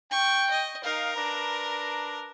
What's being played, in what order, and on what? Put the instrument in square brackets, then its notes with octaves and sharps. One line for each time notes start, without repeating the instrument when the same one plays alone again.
[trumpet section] G5 [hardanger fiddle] C#6
[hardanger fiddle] D#5
[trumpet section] D#4 F5 [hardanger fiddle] A#4
[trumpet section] D4 B4 A#5